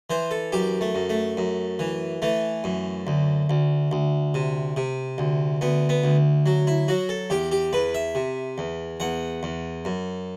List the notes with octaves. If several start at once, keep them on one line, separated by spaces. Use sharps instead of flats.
E3 C5
A4
F#2 G4
A3
F#2
A3
F#2
E3
E3 A3
F#2
D2
D2
D2
C3
C3
D2
D2 B3
B3
D2
F#3
E4
F#3 F#4
A4
E2 G4
G4
E2 B4
E5
C3
E2
E2 F#5
E2
F#2